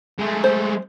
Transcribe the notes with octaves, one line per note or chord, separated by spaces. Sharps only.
G#3 A3
C5